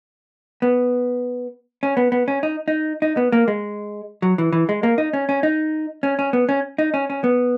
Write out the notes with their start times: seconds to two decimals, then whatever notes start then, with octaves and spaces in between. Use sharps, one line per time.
0.62 B3
1.83 C#4
1.97 B3
2.12 B3
2.28 C#4
2.43 D#4
2.68 D#4
3.02 D#4
3.17 B3
3.32 A#3
3.48 G#3
4.22 F#3
4.38 E3
4.53 E3
4.69 G#3
4.83 A#3
4.98 D#4
5.13 C#4
5.29 C#4
5.43 D#4
6.03 C#4
6.19 C#4
6.33 B3
6.49 C#4
6.78 D#4
6.94 C#4
7.10 C#4
7.24 B3